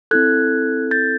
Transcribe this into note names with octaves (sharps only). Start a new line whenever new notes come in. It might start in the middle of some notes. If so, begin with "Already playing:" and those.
C4 E4 A4 F#6 G#6
G6 A6